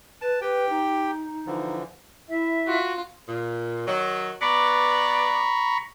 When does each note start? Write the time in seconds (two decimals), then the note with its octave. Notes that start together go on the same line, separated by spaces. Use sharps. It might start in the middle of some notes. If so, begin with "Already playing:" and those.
0.21 B4 A5
0.41 G4 B4 G5
0.69 D#4
1.47 D3 E3 F3
2.29 E4 E5
2.67 F4 F#4
3.28 A#2
3.86 D#3 F#3
4.41 B3 B4 D5 A#5 B5 C#6